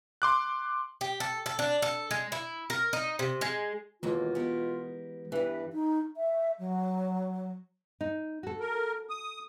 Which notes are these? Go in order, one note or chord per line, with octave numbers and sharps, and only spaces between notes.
C6 D6 F#6
G4
A4
A4
D4
A4
G#3
E4
A#4
D#4
C3
G#3
D#2 B2 E3 G#3 A#3 F4
B3 G4 A#4
E2 G2 E3 B4
D#4
E5
F#3
D#4
F#4 A4
A#4
D#6